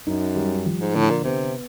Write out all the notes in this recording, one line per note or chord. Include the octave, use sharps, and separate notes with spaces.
F#2 D#4
G3
F3
G#2
A2 D3
A#2
C3 B3